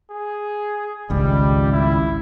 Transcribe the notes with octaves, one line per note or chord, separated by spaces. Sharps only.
G#4
G#1 C#2 G3
E4